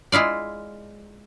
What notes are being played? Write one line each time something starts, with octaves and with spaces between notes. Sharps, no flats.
G#3 E4 F4 D5